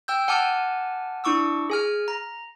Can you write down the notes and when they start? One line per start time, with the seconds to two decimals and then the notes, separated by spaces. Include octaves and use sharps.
0.08 G5 E6 G6
0.28 F#5 G#5 A5 D6 F6
1.24 D4 E4 C#6 D6 E6
1.70 G#4 G#5 F6
2.08 A#5